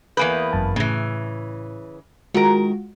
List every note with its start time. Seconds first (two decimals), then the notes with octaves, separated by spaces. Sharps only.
0.17 E2 A#3 B4 G#5 D#6 G6
0.53 G1 F#2 A5
0.76 A2 C#3 E3
2.34 D#3 G#3 F4 F#4 A#4